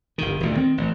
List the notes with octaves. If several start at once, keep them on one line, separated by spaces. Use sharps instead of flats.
G1 D#3
D#1 D2
D#3 B3 C4
A1